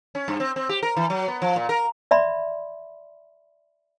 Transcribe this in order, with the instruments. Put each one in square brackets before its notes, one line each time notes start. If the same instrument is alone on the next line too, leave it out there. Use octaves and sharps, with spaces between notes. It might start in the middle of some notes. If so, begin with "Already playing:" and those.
[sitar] C#4
G2
C4
C4
G4
A#4
E3
F#3
B3
F3
A#2
A#4
[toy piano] D5 E5 B5 C6